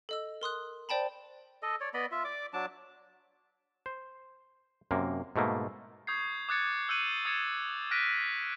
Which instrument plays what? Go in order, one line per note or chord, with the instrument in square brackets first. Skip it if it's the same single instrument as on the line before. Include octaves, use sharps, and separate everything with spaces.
[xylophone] A4 D#5 E6
A#4 C6 D#6 F#6
C5 D5 G5 A5 B5
[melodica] A4 D#5
C#5 D5
B3 D5 D#5 B5
F4 E5
D5 D6
F#3 D4 A5 D6
[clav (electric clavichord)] C5
F#2 C3 A#3
G#2 B2 A3 A#3
[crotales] C#6 D#6 G6 G#6 C7
D6 D#6 F#6 G#6 A6 C#7
E6 F#6 G6 C#7 D#7 F#7
D#6 G#6 A6 C#7 E7
F#7
F6 F#6 A#6 B6 D7 D#7